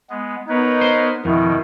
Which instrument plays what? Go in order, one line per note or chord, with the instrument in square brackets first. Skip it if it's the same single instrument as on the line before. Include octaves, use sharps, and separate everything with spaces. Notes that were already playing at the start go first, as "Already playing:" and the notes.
[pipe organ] G#3 B3
[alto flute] B3 [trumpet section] D#4 [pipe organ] A#4 B4 C#5
[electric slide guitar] C5
[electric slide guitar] F2 [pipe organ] B2 D#3 [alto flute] E4